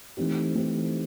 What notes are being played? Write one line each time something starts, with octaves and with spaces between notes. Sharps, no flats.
E3 A3 C4 D#4 G4
E3 A3 C4 D#4 G4